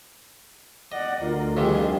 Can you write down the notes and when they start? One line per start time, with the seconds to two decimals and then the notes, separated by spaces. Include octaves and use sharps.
0.92 D5 D#5 F#5
1.22 D2 F4 A#4
1.57 F2 C3 D#3 G3 G#4